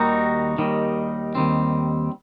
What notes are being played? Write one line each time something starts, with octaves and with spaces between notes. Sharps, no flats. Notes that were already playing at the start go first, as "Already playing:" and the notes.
Already playing: D#2 D#3 G3 D#4 F#4
D#2 D#3 G3
D#2 D#3 G3 C4